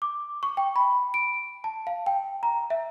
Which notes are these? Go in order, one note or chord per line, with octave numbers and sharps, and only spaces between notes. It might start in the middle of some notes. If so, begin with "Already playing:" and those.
D6
C#6
G5
B5
D7
A5
F5
G5
A#5
E5